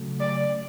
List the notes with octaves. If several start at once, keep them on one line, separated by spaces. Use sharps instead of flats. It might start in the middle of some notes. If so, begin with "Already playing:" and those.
Already playing: C#3 F#3 A3
D5